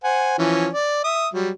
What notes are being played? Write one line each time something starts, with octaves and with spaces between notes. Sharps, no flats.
C5 F#5 G#5
E3 F3 C#4
D5
E5 D#6
F#3 G3